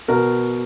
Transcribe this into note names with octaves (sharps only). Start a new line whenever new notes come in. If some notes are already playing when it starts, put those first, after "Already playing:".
B2 A#4